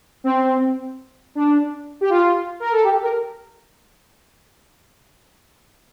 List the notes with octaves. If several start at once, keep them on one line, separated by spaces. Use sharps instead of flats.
C4
D4
G4
F4
A#4
A4
G4
A#4